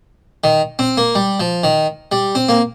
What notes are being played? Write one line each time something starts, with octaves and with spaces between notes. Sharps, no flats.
D#3
C4
A#3
G3
F3
D#3
G3
C4
A#3